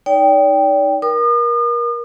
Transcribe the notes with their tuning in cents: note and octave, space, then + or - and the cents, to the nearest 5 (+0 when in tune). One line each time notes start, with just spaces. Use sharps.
D#4 +0 D5 -35 G5 +0
A#4 +25 D#6 -40